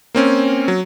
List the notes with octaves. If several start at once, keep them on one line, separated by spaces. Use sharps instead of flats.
A#3 C4 C#4
F#3